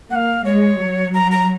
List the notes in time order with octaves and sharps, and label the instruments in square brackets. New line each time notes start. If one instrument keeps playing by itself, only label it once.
[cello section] A#3 [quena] F#5
[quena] F5
[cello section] G#3 [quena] C#5
[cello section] F#3
[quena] A#5
A#5